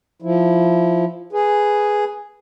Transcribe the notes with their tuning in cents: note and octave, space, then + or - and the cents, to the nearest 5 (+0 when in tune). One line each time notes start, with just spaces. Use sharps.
F3 +0 E4 +0
G#4 +0 B4 +0